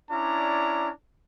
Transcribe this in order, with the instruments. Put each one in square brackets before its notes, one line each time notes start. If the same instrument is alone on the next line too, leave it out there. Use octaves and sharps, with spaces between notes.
[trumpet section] C#4 D4 E4 D5 A#5